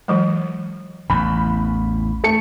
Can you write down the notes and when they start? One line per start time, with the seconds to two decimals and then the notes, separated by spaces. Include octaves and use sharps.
0.08 E3 F#3 G#3
1.10 A1 E2 B5
2.24 A3 A5 C#7